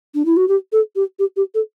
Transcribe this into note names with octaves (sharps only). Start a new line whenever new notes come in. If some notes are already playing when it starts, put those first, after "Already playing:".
D4
E4
F#4
G4
A4
G4
G4
G4
A4